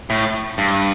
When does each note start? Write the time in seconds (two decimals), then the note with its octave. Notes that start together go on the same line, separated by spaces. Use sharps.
0.10 A2
0.58 G2